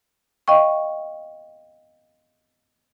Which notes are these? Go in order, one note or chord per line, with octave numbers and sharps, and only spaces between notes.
D#5 F5 G5 C#6